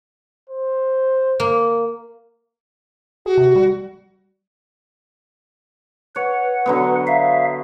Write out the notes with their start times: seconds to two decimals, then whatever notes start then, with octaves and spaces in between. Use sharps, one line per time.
0.49 C5
1.40 A#3
3.26 F#4 G#4
3.37 C3
3.56 G3
6.16 B4 C#5 F#5
6.66 D3 F#3 B3
7.07 E5 F5